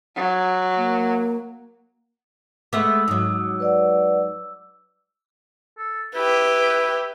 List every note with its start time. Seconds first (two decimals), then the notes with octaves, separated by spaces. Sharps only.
0.16 F#3
0.77 A#3
2.73 G#3 A3 B3 D6 E6
3.08 G#2 F#3 D#6
3.60 B4 D5 F#5
5.78 A4
6.15 E4 G4 B4